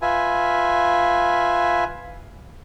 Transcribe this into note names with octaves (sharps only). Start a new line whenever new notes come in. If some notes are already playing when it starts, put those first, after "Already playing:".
F4 B4 E5 G#5